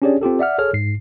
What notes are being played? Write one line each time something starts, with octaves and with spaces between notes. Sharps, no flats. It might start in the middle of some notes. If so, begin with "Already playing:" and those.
C#4 D4 G4 G#4 C#5 D5
C4 F4 G4 A4
D5 E5 F#5 F6
G#4 A4 C#5 F6
G#2 C7